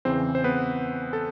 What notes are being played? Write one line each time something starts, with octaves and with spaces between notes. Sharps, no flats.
E2 C#3 E3 C4 C5
C5
B3 B4
A4